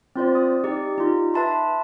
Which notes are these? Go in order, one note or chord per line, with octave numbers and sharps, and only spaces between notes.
C4 F4 C5 D5
D#6
D#4 G4 D5
D#4 F4
B4 E5 A5 B5 C6